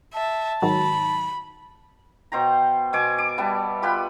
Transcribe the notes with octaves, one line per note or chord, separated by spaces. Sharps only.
E5 A5
G#2 D#3 F#3 B5
B2 C5 G5 A#5
B2 G#5 D6
D6
G3 B3 E5 A5
F4 G4 B4 B5